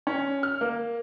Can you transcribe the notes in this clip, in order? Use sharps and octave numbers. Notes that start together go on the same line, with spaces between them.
C#4
F6
A#3